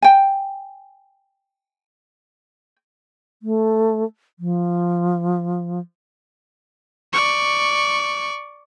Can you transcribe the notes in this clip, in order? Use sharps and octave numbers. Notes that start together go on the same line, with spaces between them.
G5 G#5
A3
F3
D5 C#6